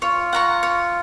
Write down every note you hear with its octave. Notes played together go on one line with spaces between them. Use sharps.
F4 C#5
F#5 A#5 C#6
C#5